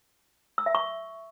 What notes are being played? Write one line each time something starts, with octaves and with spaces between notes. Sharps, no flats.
E6
E5
C#6